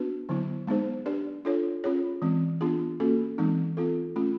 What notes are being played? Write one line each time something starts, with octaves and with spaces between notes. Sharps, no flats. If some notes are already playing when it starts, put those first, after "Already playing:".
Already playing: B3 D4 F#4 B4
D3 F#3 B3 E4
G#3 B3 D#4 G#4 C5
D4 G4 B4 D5
D4 F4 A4 C#5
C#4 F4 G#4 C#5
E3 G#3 C4
B3 D4 F4 G#4
A#3 C#4 F#4 A4
E3 G#3 C4 D#4
C4 F4 A4
A3 C#4 F4